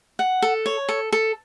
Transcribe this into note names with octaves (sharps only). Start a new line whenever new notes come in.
F#5
A4
C#5
A4
A4